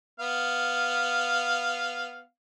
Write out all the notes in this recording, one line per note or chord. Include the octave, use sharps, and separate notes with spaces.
B3 F5